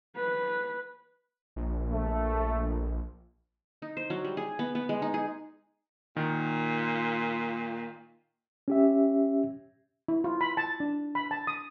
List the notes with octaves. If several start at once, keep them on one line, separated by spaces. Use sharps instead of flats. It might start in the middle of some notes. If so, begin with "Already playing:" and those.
B4
A#1
A3
D#4
C5
F#3
G3
G#4
B3
B3
G#3
D#4
G#4
A#2 D#3
C#4 G4 E5
E4
F4
B5
A5
D4
B5
A5
D#6